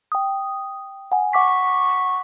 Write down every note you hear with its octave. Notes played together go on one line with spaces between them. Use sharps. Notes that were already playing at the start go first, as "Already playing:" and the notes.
G5 D#6
F#5 G#5
F#5 C#6 D6 B6